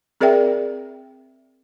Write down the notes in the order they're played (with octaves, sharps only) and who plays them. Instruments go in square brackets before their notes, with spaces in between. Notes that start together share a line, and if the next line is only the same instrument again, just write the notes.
[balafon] C4 G#4 A#4 D5 E5 G5